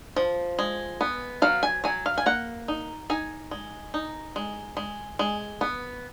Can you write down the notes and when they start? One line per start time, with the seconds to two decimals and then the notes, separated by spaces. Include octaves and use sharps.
0.16 F3
0.59 G#3
1.01 B3
1.42 F#3 F5
1.63 G#5
1.84 F#3 G#5
2.06 F5
2.18 G#5
2.26 A#3 F#5
2.68 D#4
3.10 D#4 G#5
3.51 G#3
3.94 D#4
4.36 G#3
4.77 G#3
5.19 G#3
5.61 B3